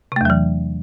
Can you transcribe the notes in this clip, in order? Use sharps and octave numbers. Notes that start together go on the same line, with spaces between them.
E2 C3 E3 F#3 A3